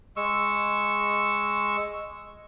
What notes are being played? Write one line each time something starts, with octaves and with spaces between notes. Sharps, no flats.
G#3 C#6 E6